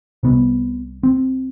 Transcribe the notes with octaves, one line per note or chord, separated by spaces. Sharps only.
C2 C3 B3
C4